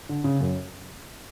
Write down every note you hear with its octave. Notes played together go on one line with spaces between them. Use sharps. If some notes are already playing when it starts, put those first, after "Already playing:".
D3
C#3
F#2